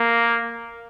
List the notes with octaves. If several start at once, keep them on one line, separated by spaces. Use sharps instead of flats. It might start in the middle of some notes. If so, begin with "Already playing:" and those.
Already playing: A#3